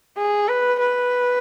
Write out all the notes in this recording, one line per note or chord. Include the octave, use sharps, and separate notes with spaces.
G#4
B4
B4